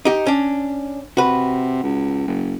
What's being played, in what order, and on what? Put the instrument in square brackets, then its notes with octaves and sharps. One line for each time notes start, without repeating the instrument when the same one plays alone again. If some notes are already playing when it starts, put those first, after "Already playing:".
[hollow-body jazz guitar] D#4 G4
C#4 D4
[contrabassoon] C3 [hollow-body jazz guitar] F#4 B4
[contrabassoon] C#2
F#1